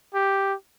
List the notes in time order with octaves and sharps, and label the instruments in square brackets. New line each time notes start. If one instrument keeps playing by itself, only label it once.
[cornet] G4